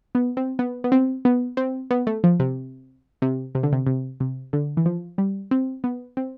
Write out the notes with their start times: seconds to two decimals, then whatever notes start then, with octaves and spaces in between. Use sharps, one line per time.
0.15 B3
0.37 C4
0.59 B3
0.84 B3
0.92 C4
1.25 B3
1.57 C4
1.91 B3
2.07 A3
2.24 F3
2.40 C3
3.22 C3
3.55 C3
3.63 D3
3.72 C3
3.87 C3
4.20 C3
4.53 D3
4.77 E3
4.86 F3
5.18 G3
5.51 C4
5.84 B3
6.17 C4